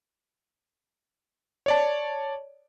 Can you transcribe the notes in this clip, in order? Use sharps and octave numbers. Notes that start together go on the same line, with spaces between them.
C#5 D5 A5